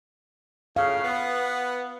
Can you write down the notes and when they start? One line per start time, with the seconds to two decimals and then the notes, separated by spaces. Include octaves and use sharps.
0.76 A2 C#3 F5
1.04 B3